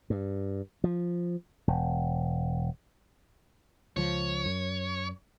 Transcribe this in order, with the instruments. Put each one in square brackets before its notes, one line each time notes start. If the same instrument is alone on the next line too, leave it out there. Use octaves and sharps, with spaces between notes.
[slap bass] G2
F3
E1
[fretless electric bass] C#2 F3 [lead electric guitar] C#5
[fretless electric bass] F#2